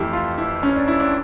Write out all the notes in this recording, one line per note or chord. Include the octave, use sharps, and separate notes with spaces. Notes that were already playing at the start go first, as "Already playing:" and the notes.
Already playing: F2 E3 A3 E4 G4
F4
E4
C#4
D4
E4
D4